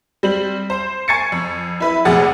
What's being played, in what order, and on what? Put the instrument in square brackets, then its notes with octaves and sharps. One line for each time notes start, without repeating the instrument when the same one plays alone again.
[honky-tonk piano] G3 C4 F#7
C5
G#5 C#6 G#6 A6 C7 C#7
F2
E4 B4 E5
F1 F2 A#2 G#4 F#5 A6